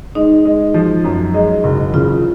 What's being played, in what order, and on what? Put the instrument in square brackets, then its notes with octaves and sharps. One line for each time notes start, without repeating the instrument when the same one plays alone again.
[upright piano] G#3 [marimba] D#4
[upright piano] G#3
F3
F#2
G#3
F#1
[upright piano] C#3 [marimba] F4